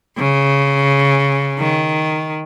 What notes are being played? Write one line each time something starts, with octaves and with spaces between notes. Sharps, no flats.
C#3
D#3